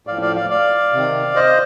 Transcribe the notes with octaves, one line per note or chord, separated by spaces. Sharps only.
A2 F3 D5 F5
D5 F5
D5 F5
D5 F5
C3 D#3
C5 D#5